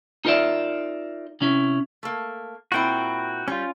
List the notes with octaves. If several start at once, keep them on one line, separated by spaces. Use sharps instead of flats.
D#4 F4 A#4 C5 D5 E5
C3 C#4 E4
A3 A#3
A#2 C4 E4 F#4 G5
G3 C#4 F4